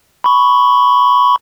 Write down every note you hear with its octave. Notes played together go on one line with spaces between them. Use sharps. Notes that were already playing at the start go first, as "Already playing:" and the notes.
B5 C#6